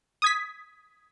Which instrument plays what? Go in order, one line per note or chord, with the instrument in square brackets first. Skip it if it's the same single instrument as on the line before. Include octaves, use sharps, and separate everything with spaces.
[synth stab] D#6 G#6 B6